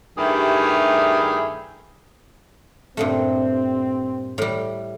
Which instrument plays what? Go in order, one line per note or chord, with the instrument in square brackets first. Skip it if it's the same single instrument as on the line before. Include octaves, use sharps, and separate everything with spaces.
[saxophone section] G2 D#3 A3 E4 G4 G#4
[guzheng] G2 A#2 A3 [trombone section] C4
[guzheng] A2 G3